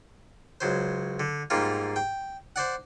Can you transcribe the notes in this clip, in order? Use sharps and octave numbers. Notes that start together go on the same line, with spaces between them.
C#2 F#3 C5
D3
G#2 G3 A#3 F4
G5
C5 D5 F#5